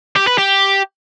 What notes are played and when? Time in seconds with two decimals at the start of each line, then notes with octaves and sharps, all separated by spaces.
0.16 G4
0.27 B4
0.38 G4